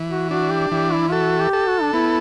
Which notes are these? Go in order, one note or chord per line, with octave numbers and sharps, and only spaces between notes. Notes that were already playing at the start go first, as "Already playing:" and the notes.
Already playing: E3
F#4
D4 F#4
G4
E3 G4
E4
F#4 A4
G4
A4
F#4
D4
B3 E4